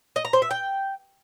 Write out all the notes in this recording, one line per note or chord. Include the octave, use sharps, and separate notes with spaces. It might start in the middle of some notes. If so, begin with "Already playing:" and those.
D#5
A#5
C5
E5
G5